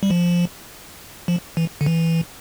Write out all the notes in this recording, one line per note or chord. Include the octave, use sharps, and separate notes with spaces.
G3
F3
F3
E3
D3
E3